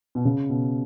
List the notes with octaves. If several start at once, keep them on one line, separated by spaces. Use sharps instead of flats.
B2
C#3
B2